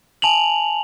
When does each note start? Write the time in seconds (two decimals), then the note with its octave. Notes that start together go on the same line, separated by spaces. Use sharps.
0.22 G#5 A5 F7 F#7